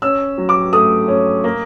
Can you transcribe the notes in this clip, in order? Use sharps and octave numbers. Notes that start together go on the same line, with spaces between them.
C#4 E6
F#3
D6
A3 D#6
C#4
A#3